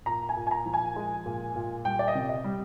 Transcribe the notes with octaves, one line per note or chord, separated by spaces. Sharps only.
A#2 A#5
G#5
A#2
G#5
A#5
F3
G#5
G#3
A#2
A#2
G3 G5
D5
D#5
C3
D#5
G3